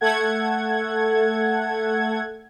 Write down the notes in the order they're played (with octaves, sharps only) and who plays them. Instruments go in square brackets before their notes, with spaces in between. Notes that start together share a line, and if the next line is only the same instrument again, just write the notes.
[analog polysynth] A3 A4 F#5 G#6